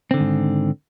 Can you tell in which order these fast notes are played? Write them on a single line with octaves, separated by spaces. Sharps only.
C4 D3 D#3 G#2